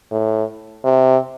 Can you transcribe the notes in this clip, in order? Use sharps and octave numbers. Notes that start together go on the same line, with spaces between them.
A2
C3